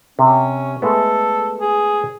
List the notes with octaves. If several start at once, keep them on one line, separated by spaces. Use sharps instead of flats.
C3 C#4
G#3 A3 B3 A4
G#4